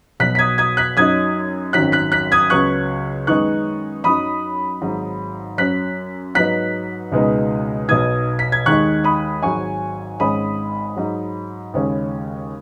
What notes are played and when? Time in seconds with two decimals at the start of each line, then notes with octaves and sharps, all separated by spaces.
0.20 B1 B2 F#3 F#6 B6
0.35 B6
0.39 D#6 G#6
0.58 D#6 G#6
0.77 F#6 B6
0.97 F#2 F#3 D#4 D#6 G#6
1.73 G#1 F#2 D#3 F#3 F#6 B6
1.92 F#6 B6
2.12 F#6 B6
2.32 D#6 G#6
2.50 C#2 C#3 F#3 B3 C#6 F#6
3.27 F#2 D#3 G#3 B3 D#4 C#6 F#6
4.04 F#2 F#3 D#4 B5 D#6
4.82 G#1 G#2 F#3
5.58 F#2 F#3 C#4 F#6 B6
6.35 G#2 F#3 B3 D#4 F#6 B6
7.12 C#2 B2 G#3 B3 D#4
7.89 B1 B2 B3 D#4 D#6 G#6
8.39 B6
8.52 G#6
8.66 D#2 D#3 G#3 D#4 C#6 F#6
9.04 B5 D#6
9.42 G#1 G#2 F#3 G#5 C#6
10.20 G#1 G#2 G#3 C#4 B5 D#6
10.96 G#2 F#3 D#4
11.74 D#2 C#3 G#3 C#4